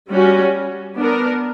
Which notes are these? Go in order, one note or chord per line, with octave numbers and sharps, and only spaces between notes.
G3 C#4 F#4
B3 D4 A#4